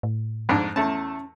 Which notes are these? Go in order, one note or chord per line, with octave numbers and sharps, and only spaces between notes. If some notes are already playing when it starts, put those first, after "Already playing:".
A2
F2 G#2 D4
E2 A3 C#4 A5